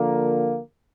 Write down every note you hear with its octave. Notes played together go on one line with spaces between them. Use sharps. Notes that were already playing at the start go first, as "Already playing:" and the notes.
Already playing: D3 F3 A#3